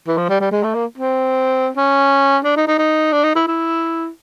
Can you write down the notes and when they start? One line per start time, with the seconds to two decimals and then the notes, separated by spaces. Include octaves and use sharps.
0.07 E3
0.18 F3
0.29 G3
0.40 G3
0.52 G#3
0.63 A3
0.75 A#3
0.98 C4
1.77 C#4
2.45 D4
2.57 D#4
2.68 D#4
2.78 D#4
3.12 D4
3.24 D#4
3.35 E4
3.47 E4